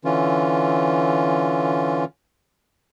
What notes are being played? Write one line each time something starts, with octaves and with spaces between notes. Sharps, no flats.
D3 E3 C#4 F4